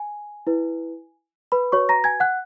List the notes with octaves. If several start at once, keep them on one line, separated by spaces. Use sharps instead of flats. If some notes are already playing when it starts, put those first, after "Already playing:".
Already playing: G#5
E4 B4
B4 B5
F#4 B4 C#5 C#6
A#5 A#6
G#5 G#6
F#5 F#6